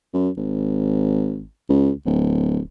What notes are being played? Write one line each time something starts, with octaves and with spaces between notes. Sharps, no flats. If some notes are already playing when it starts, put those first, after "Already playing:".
F#2
G#1
C#2
D1